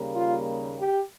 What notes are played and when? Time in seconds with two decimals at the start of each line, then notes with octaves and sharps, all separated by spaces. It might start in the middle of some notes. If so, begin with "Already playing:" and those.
Already playing: D#2 C#3 G3 A#3
0.14 F4
0.79 G4